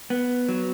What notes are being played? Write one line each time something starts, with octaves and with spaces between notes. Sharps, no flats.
B3
F#3